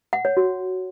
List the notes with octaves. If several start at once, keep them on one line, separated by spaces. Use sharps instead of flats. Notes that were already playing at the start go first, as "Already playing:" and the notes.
F#5
C#5
F#4